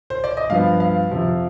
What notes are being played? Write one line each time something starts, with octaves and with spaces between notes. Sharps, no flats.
C5
D5
D#5
G2 F3 B3 F5
F5
F2 C3 F3